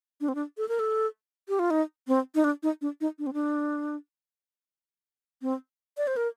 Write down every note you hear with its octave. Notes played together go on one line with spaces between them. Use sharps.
D4
C4
D4
A4
A#4
A4
G4
F4
D#4
C4
D#4
D4
D#4
D4
D#4
D4
C4
D4
C4
D5
C5
A#4